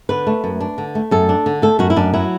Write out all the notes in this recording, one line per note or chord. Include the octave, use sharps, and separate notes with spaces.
D3 B4
A3
F#2
D4
D3
A3
F#2 A4
D4
D3
A3 A4
F#2 F#4
E4
F#2 D4
F#3 E4